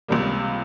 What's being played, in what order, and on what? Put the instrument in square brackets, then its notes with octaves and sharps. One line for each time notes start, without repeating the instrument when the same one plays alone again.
[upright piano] C#2 C3 G3 A#3